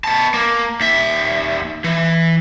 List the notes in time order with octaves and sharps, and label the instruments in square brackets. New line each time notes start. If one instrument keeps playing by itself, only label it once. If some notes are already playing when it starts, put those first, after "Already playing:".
[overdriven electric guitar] B3 A5
A#3
D#2 E5
E3